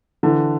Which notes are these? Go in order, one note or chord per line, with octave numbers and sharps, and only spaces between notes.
D3 E3